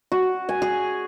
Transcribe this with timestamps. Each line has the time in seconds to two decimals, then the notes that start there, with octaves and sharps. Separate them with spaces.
0.12 F#4
0.49 G#5
0.62 G#4